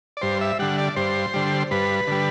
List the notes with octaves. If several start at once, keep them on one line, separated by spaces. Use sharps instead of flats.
D5
G2 C5
E5
D3 G3 F#5
D5
G2 C5
D3 G3
G2 B4
D3 G3